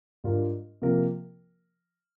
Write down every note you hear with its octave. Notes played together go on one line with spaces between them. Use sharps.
G#2 G3 D4 F4 A#4
C3 F3 A#3 F4 A#4